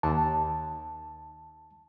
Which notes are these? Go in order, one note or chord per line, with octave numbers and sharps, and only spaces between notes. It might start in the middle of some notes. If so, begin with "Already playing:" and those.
D#2 A5